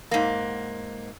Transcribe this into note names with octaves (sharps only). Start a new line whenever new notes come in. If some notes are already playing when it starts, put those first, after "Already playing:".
G#2 A#3